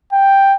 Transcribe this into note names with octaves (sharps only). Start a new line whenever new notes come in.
G5